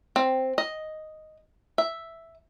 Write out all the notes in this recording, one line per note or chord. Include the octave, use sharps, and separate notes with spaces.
C4
D#5
E5